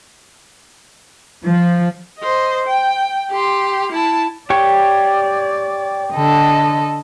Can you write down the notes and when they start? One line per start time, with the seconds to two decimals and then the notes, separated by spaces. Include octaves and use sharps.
1.45 F3
2.19 C5 D#5
2.67 G5
3.30 G4 C6
3.92 E4 A5
4.50 G4 C#5 D5 C#6
6.14 D3 A4 D#5